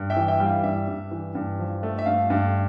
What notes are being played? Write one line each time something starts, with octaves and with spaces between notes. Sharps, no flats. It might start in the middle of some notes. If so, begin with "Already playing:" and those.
Already playing: G2
E5 G5
E3
E5 G5
G3
F5
G2 E5
G2
E3
G2
F3
A3
E5
G2 F5
G2